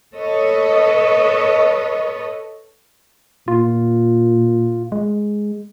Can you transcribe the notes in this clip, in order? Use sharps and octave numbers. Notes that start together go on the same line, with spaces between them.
A4 B4 C#5 D#5
A#2 F4
G#3